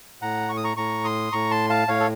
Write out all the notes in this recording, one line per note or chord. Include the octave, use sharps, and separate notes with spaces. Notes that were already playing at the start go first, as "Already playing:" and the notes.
A2 F#5 A#5
C#6
D#6
A#5 C#6
A2 A#5 C#6
C6 D#6
A2 A#5 C#6
A5 C6
F5 A5
A2 C#5 F5
A4